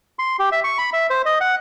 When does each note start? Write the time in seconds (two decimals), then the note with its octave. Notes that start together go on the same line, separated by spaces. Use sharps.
0.19 C6
0.39 G4
0.52 E5
0.64 C#6
0.78 B5
0.93 E5
1.10 C5
1.26 D#5
1.41 F#5